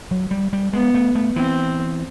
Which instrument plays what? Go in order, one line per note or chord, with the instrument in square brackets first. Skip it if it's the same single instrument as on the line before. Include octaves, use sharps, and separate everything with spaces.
[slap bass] F#3
G3
G3
[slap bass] G#3 [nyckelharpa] B3
[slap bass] A3
A3
[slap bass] E3 [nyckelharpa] C4